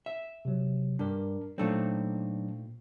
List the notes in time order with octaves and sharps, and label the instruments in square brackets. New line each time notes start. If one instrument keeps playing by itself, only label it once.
[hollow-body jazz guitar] E5
[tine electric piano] C3 F#3
[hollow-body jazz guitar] G2 [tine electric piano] D4 A#4
[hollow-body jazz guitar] A#2 A3 C4 [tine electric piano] F#3 D4 D#4